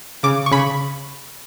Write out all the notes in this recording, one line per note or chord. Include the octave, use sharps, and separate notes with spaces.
C#3 D6
C#6
C#3 B5